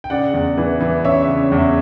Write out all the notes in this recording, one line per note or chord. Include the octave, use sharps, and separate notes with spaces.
G5
C#3 D5 F#5
E2
E3
E3
C#3 C#5 E5
C#3
E2